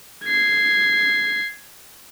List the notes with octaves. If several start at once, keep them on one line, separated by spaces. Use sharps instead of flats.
G#6 C7